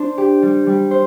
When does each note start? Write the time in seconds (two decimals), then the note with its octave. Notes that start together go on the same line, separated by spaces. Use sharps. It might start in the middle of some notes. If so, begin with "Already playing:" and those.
Already playing: D4 C5
0.18 G4
0.42 G3
0.67 G3
0.91 C5